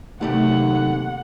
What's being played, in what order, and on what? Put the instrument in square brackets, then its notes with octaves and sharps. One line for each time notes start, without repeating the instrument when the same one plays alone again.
[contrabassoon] D#2 [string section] C3 F#3 [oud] A3 D4 G4 [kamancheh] F#5